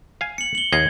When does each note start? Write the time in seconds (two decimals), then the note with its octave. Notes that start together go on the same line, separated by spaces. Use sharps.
0.21 F5 G#5
0.38 C#7 F#7
0.55 F#7 G7
0.73 D#2 D#5 F5 G#6